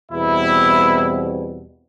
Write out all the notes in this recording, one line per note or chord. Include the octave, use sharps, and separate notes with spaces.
E2 B2 G3 C4 E4